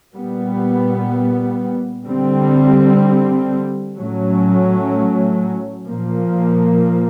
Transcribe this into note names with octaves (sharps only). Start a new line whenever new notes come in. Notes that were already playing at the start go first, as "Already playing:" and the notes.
A#2 G3 B3
D3 G3 C4
A2 F#3 A3 C#4
A#2 F3 A#3